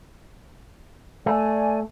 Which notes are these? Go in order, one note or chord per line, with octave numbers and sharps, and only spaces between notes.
A3 D5 G#5